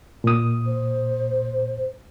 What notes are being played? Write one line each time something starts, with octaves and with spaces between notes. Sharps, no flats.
A#2 D#6
C5